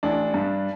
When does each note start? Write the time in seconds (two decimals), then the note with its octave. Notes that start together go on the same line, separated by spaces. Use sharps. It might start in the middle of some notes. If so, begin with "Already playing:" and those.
0.03 A1 D4
0.34 G2